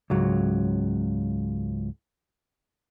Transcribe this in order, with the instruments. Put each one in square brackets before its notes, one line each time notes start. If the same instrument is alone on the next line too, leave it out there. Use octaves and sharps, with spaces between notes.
[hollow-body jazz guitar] C#2 G#2 F#3